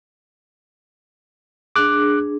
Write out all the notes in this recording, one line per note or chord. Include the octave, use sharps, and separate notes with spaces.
D4 G#4 D6 F#6